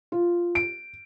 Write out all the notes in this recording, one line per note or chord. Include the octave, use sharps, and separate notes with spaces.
F4
D7